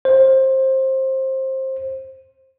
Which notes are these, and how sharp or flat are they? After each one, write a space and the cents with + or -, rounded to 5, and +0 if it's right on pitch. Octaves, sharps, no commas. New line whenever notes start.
C5 +20